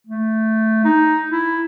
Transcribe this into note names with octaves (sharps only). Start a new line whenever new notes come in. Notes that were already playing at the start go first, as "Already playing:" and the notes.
A3
D#4
E4